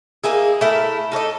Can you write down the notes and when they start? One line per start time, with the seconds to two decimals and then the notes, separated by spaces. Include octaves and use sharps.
0.24 A#3 D#4 E4 G#4
0.61 A3 E4 A#4
1.12 D#4 A4 C#5 D#5